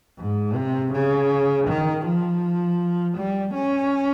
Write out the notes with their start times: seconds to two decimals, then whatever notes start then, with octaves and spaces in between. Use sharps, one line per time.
0.18 G#2
0.55 C3
0.92 C#3
1.68 D#3
2.05 F3
3.17 G3
3.54 C#4